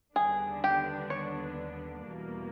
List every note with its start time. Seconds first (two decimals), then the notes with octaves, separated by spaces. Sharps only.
0.16 D#2 D3 G3 B3 D4 G#4
0.64 G4
1.10 C#5
2.05 E2 B2 G3 A#3